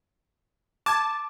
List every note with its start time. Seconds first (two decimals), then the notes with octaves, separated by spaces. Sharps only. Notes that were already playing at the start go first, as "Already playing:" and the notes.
0.86 A5 D6 G#6